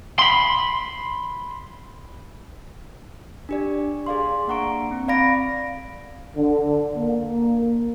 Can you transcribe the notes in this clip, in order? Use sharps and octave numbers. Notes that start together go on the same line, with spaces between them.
B5 C6
D4 G4 D5
G#4 D5 F5 C6
A#3 D4 F#5 A#5 C#6 D7
C4
D5 F5 B5 A#6 D7
D3
A#3